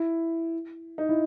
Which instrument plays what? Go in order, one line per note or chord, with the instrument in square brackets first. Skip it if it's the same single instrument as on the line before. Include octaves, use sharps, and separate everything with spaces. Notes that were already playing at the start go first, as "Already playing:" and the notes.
Already playing: [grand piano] E4
D#4
E4